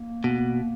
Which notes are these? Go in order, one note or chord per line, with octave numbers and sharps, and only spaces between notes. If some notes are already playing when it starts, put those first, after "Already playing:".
Already playing: A#3
B2